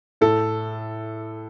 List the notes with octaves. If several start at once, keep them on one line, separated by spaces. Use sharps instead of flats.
A2 A4